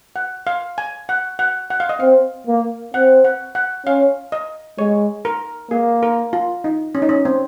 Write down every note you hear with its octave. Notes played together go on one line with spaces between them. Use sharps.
F#5
F5
G#5
F#5
F#5
F#5
F5
D#5
C4 F5
A#3
C4 F#5
F#5
F#5
C#4 F5
D#5
G#3 C#5
A#4
A#3 G#4
A#4
F4
D#4
C#4
D#4
C#4
C4